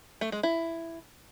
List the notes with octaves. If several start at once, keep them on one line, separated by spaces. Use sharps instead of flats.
A3
G#3
E4